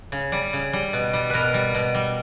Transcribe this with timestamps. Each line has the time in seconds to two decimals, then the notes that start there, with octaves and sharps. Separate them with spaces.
0.12 C#3
0.32 G3
0.53 C#3
0.73 G3
0.93 B2
1.13 G3
1.30 B2 A#4 B4
1.54 G3
1.75 B2
1.95 G3